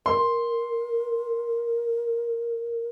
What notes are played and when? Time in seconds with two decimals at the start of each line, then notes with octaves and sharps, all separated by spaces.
0.06 A#4 C6